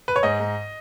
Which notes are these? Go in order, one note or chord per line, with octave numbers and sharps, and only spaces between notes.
B4
C#5
G#2 D#5
G#2